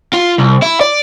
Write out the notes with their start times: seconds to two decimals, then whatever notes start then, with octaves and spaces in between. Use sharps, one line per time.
0.13 F4
0.38 C2
0.62 E4
0.81 D5